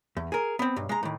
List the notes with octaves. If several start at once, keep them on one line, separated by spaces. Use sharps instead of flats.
E2
G#4 A#4
B3 C4
B1 G2
G#3 A#5
A2 D#3